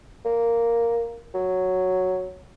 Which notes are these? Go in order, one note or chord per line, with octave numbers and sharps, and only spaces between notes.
A#3
F#3